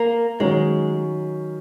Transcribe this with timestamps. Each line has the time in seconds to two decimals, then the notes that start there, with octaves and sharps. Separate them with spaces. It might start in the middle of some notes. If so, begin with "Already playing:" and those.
Already playing: A#3
0.40 D#3 F#3 G#3 C#4